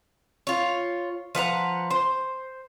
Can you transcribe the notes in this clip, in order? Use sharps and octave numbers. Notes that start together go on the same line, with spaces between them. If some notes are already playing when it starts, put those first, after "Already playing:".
F4 C#5
F3 B4 F#5 A#5
C5